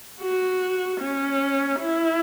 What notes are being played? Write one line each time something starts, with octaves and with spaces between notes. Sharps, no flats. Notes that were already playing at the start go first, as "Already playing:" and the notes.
F#4
C#4
E4